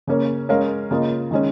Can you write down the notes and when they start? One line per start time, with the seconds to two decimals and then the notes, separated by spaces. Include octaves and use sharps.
0.07 C#3 A#3 C#4 A#4 C#5
0.49 G#3 C#4 A#4 C#5 F5
0.90 C#3 A#3 F4 A#4 D#5
1.31 D#3 G#3 C#4